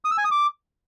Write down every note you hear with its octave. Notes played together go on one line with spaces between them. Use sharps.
D#6
E6
G#5
D#6
D6